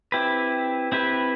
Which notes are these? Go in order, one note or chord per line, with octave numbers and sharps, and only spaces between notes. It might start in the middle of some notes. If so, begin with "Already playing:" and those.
C4 E4 G4 B4
C4 E4 G4 B4